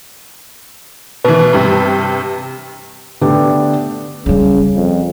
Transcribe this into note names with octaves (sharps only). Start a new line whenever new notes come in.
B2 E3 B4
G2 C3
D3 A3 B3 D4 G4 B4
C#3 G3 C#4
F2